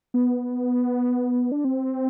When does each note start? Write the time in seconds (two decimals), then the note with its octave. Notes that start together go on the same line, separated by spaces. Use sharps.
0.14 B3
1.52 D4
1.64 C4